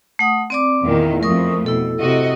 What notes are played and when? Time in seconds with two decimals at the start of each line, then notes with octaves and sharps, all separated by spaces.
0.19 A3 F#5 D#6
0.50 C4 D5 D6
0.83 E2 A#2 D#3
1.23 F2 F3 A3 A#4 C#6 D#6
1.66 B2 E4 A4
2.00 C3 F#4 D#5